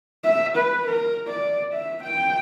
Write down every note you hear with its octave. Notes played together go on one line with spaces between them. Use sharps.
E5
B4
A#4
D5
E5
G5